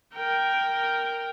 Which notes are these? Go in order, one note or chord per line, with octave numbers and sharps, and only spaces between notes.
A#4 G5